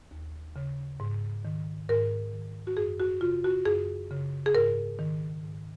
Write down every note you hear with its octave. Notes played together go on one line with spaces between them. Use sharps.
D#2
C#3
G#2
D#3
G#2 A#4
D#3
F#4
F#2 G#4
F#4
C#3 F4
F#4
F#2 G#4
C#3
G#4
G#2 A#4
D#3
G#2